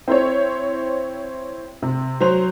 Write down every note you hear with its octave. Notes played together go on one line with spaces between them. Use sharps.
C4 E4 C5 C#5
C3
F#3 C5 F7